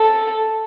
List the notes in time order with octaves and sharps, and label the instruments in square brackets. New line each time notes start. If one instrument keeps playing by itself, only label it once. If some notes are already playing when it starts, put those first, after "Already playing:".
Already playing: [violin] A4